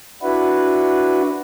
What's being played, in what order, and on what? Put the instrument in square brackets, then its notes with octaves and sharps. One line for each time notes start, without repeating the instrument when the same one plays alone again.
[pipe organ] D4 E4 F#4 B4